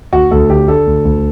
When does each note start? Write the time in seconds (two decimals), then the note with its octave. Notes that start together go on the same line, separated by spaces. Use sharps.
0.13 D2 F#4
0.31 D2 A4
0.49 D3 G4
0.68 D3 A4
0.87 D2
1.05 D2